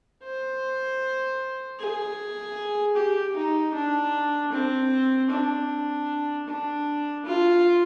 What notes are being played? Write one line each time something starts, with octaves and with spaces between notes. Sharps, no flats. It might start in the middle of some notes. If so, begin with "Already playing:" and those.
C5
G#4
G4
D#4
D4
C4
D4
D4
F4